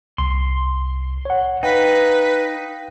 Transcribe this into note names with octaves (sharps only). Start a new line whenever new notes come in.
C2 C6
C#5 F#5
D#4 B4 F5 G5